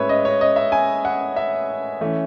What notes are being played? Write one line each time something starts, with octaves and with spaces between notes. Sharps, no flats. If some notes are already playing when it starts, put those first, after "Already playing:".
Already playing: A2 G#3 C#4 B4 C#5 E5
D#5
C#5
D#5
E5
G#5
F#5
E5
E3 A3 C#4